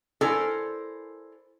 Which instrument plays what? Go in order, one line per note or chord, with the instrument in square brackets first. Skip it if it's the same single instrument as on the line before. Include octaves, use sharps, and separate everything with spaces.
[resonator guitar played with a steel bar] E4 A4 A#4 C5 D5 G#5